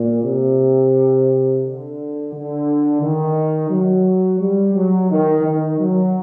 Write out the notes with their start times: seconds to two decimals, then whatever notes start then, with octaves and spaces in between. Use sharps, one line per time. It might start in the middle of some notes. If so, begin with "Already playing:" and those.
Already playing: A#2
0.24 C3
1.64 D3
2.32 D3
3.02 D#3
3.70 F#3
4.40 G3
4.74 F#3
5.10 D#3
5.45 D#3
5.78 F#3